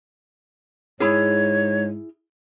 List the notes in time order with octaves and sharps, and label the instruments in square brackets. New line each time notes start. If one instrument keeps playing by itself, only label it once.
[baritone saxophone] G#2 [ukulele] E4 G#4 [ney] C#5